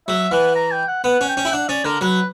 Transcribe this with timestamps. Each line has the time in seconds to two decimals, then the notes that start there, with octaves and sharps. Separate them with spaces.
0.08 F#3 E5
0.31 E3 F#5
0.56 A#5
0.72 G5
0.88 F#5
1.04 B3 F#5
1.21 C#4
1.29 G5
1.37 C#4
1.45 E4
1.53 D4 F#5
1.69 C#4 D5
1.85 D3 A#4
2.01 F#3 B4